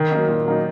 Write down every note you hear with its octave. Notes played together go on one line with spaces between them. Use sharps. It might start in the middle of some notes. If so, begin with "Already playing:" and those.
Already playing: D#3
F#3 A#3 D#4
A#2
F#3 A#3 D#4